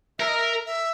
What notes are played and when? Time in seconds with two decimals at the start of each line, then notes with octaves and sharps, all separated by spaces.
0.19 A#4 E5
0.28 D#5
0.37 E5
0.66 E5